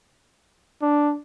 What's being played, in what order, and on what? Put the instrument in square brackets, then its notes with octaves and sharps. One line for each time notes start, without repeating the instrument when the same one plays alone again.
[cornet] D4